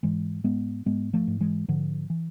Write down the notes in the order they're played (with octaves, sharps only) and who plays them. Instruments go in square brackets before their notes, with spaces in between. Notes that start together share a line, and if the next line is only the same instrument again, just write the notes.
[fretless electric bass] G#2 E3 G#3
G#2 G#3 B3
G#2 G#3 B3
F3 A3
G#2
E3 G#3
G#2 D3 F3
E3